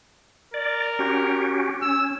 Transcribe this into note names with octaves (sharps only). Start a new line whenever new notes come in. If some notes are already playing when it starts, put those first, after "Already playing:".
A#4 D5
C#4 F#4 G4
C#4 E6